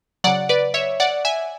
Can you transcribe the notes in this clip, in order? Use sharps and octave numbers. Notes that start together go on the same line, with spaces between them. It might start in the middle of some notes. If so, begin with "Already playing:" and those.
C#3 F#3 D5 F#5
B4 D5
C#5 E5
D5 F#5
E5 G#5